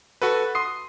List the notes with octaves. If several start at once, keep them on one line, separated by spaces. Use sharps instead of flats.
F#4 A4 B4
C6 D#6 C7